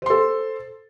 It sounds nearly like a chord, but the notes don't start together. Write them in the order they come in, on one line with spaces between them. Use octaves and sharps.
C5 C6 A4